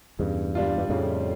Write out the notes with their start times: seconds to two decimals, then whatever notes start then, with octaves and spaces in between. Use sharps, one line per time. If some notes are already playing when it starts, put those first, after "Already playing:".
0.19 E2 G2 C#3
0.55 G3 D4 F4
0.78 G2
0.89 F2 A2 C#3